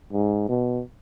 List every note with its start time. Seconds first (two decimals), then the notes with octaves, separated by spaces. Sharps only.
0.13 G#2
0.49 B2